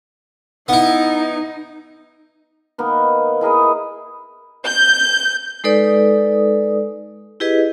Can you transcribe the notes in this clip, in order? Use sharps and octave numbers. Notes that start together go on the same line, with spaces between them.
B3 D#4 E4
D#3 A#3 B3
E4 G#4 A#4 D#5
G6
G#3 D#4 A4 B4 D5 D#6
E4 G4 G#4 B4 D#5